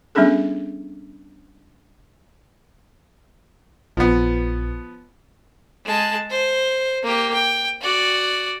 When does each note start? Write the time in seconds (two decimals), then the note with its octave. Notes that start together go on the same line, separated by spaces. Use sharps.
0.15 G3 B3 C#4 D4 G#4 A4
3.97 A#1 F3 B3 B4
5.85 G#3 A5
6.30 C5
7.03 A#3 G4
7.34 G5
7.82 F#4 D5